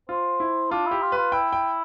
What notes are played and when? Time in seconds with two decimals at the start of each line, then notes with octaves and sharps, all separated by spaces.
0.09 F4 C5
0.40 E4
0.71 D4 F4
0.87 E4 G4
1.02 F4
1.12 F4 B4
1.32 E4 G5
1.53 G5